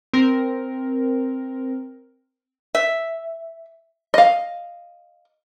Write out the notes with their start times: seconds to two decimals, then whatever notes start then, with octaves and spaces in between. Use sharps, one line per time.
0.13 C4 A#4
2.75 E5
4.14 D#5 F5